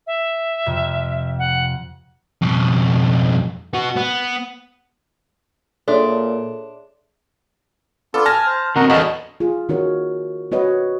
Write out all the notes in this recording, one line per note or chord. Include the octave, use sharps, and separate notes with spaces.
E5
F2 C3
F#5
F2 B2
B3 F#4
B3
A#2 D4 G#4 A4 C#5 E5 C6
B3 D4 F4 A4
G#5 A5 F6 A#6
C5
D3 C4 F#4 A#4 D#5 F#5
E2 D4 F#4 A4 B4 D#5 F5
F4 G#4
D#3 D#4 F#4 A#4 C#5
B3 F#4 B4 C#5 D#5